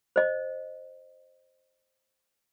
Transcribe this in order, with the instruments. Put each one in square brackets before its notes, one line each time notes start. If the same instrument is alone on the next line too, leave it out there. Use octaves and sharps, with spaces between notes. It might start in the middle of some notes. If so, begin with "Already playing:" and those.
[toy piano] C5 D#5